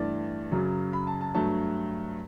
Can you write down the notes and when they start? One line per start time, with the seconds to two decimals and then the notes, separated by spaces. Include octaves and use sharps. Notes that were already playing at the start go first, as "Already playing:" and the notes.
Already playing: G2 E3 A3 D5
0.51 F#2 C#3 F#3
0.93 B5
1.07 A5
1.21 A5
1.34 G2 F#3 A3 A5